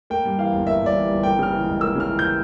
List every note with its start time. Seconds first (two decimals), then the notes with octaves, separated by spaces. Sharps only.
0.10 A#3 G5
0.25 G2
0.38 E3 F5
0.53 G1
0.67 A#3 E5
0.82 G2 D5
0.96 E3
1.10 G1
1.23 A#3 G5
1.39 C#3 F6
1.53 E3
1.66 C#2
1.81 A#3 E6
1.95 C#3 F6
2.09 E3
2.19 G6